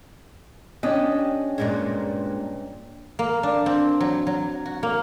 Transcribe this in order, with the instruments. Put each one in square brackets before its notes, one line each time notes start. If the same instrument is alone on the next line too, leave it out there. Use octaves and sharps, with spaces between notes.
[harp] C#4 D4 D#5 [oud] G4
[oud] G2 A#2 G#3
[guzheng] A#3
D4
C4
F#3
F#3
F#4
A#3